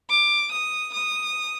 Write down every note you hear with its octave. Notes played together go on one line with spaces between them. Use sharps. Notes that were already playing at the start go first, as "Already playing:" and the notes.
D6
D#6
D#6